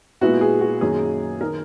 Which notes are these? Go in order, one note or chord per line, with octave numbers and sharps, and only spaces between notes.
A#2 G#3 B3 E4 F#4
G#4
F#4
F#2 D#3 A#3 D#4 G#4
D#3 A#4